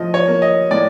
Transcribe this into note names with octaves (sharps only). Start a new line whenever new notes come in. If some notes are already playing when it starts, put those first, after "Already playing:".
Already playing: A2 F3 D#5
C#5
A#3
D#5
A2 D5